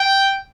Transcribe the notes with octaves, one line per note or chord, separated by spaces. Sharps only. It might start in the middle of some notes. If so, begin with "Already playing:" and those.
Already playing: G5